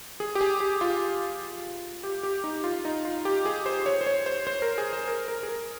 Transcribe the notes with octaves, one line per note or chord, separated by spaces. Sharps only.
G#4
G4
G#4
G4
F4
G4
G4
D#4
F4
D#4
F4
G4
G#4
C5
C#5
C5
C#5
C5
C5
A#4
G#4
C5
A#4
A#4
G#4
A#4